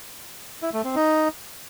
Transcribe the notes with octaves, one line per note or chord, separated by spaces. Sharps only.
E4
A3
C4
D#4